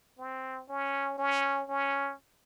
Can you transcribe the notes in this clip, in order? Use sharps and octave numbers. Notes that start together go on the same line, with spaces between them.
C4
C#4
C#4
C#4